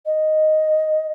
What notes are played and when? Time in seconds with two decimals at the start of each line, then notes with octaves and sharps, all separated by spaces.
0.06 D#5